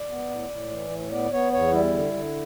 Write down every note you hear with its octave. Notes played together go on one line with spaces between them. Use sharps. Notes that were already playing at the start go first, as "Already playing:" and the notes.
Already playing: D5
B3
A2
A2
E3
A2
B3 D5
B3 C#5
E2 C#5
G3 E4
D3
D3